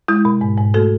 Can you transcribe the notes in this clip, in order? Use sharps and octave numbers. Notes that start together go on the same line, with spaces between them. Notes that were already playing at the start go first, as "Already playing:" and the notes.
G#3 E4
B2
G#2
G#2
A3 F#4 A4